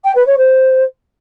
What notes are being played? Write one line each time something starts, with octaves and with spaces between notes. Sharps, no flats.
G5
B4
C#5
C5